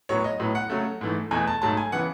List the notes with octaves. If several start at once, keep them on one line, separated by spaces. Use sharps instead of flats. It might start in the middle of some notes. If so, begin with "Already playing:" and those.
A2 F#3 B3 C#5
D#5
A2 F#3 B3
F#5
C#3 F#3 A3
G#2 E3 A3
E2 B2 A3 G#5
A5
G#2 F#3 A3 A5
G#5
C#3 E3 B3 F#5